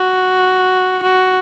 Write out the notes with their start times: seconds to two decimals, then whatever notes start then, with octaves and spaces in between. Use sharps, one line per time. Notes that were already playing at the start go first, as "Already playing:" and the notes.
Already playing: F#4
1.03 F#4